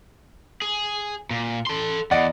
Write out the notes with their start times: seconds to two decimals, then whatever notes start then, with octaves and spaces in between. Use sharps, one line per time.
0.62 G#4
1.31 A#2
1.67 A4 C6
2.11 E2 D5 D#5 F#5